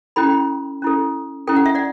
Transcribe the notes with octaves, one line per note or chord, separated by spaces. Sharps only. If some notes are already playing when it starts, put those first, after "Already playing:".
C#4 E4 A4 G5 B5
C#4 E4 A4
C#4 E4 A4 G5
F#5
E5
D5 F#5